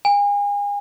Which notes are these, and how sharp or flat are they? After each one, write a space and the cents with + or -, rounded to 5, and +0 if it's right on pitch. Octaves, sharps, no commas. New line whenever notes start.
G#5 -35